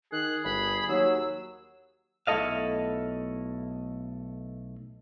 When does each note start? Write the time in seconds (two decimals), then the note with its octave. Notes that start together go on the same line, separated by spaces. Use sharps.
0.12 D#3 G#4 F#6
0.44 G1 B5
0.88 D#2 F#3 E6
2.27 B1 A3 E4 A4 D#5 F5